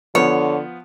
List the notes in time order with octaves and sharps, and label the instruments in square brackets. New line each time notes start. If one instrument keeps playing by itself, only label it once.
[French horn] D3 [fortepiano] F3 B3 [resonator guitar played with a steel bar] C#5